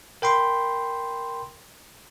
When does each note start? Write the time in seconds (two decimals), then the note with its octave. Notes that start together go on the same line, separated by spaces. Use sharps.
0.22 A#4 G5 B5 C6